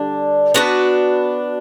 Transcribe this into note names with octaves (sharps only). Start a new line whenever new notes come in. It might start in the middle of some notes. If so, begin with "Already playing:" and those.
Already playing: D3 G3 D4
B3 D4 F#4 B4